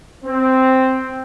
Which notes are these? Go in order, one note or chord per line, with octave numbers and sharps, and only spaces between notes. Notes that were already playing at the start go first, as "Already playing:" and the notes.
C4